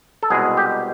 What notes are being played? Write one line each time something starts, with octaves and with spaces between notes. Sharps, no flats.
A4
C2 B2 G#3 G#4
G4